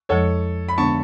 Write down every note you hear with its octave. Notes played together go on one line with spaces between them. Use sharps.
F2 F3 G#3 A4 C#5
B5
D3 G#3 B3 D4 A5 C#6